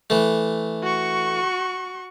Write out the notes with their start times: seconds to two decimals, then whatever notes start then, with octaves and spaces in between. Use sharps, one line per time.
0.10 E3 A3
0.83 F#4 C#6